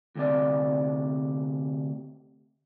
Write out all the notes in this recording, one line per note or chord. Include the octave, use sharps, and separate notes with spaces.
D2 C3 D5